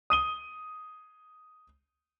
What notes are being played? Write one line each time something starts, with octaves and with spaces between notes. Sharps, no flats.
D#6 D#7 G7